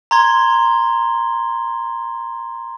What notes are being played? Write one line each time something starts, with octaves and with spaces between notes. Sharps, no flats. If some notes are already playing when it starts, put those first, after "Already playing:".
A#5 C6 G#6 G7